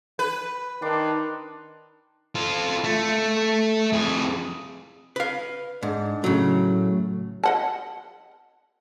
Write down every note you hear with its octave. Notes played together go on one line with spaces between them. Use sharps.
B4
D#3 D4 C6 D6
F4 A4
A3
F2 G#4
B4 F5
G#2 D4
A2 C#3 F#3 A3
D#5 F#5 A5